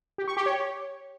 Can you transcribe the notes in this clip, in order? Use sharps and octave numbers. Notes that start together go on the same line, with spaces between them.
G4
C#6
G4
C#5